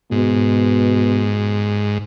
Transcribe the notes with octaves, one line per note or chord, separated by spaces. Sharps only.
G#2 B2